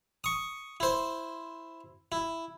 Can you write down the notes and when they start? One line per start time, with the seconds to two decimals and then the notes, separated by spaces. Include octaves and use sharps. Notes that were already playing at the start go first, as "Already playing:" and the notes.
0.24 C#6 D#6
0.80 E4 C5
2.12 E4